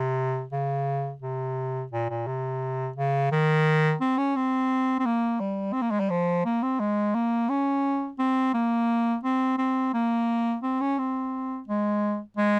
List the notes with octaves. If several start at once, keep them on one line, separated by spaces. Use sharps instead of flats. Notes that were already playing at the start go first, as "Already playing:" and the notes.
Already playing: C3
C#3
C3
A#2
A#2
C3
C#3
D#3
C4
C#4
C4
C4
A#3
G3
C4
A#3
G#3
G3
F3
A#3
C4
G#3
A#3
C#4
C4
A#3
C4
C4
A#3
C4
C#4
C4
G#3
G#3